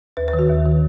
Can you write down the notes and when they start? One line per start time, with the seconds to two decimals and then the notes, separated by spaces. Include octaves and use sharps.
0.17 D#2 B4
0.28 B4
0.33 D#3
0.39 F#4
0.49 D#2
0.66 D#3